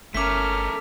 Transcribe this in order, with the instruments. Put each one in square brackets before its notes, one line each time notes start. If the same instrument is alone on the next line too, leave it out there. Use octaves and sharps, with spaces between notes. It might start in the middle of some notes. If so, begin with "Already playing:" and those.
[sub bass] G1 [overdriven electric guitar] A3 A#4 [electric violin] C#4 F6 [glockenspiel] D6 B6